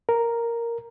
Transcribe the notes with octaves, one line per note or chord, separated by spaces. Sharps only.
A#4